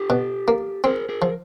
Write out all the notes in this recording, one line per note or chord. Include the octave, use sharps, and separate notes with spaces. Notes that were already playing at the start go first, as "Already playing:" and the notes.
Already playing: G4 A4
B2
A#3
C4 G#4 A#4
G#4 A#4
F3